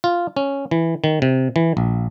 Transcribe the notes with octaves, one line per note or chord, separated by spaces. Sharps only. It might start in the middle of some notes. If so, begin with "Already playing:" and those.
F4
C#4
E3
D#3
C3
E3
A#1